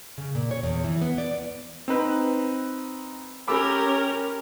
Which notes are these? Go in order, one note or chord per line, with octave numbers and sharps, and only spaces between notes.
C#3
A#2
C#5
E2
E3
B3
D5
C4 D#4 B4
C#4 G4 A#4 B5 D6 E6